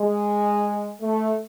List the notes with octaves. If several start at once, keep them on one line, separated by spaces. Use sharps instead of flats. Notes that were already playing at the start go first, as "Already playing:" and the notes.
Already playing: G#3
A3